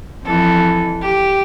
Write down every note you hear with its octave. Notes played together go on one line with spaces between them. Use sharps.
F2 E3 A4
G4